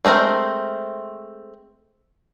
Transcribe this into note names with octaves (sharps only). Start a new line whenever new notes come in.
G#3 A3 C4 A#4 C5